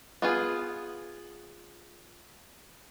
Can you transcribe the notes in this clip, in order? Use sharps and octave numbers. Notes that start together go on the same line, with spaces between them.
B3 F4 G#4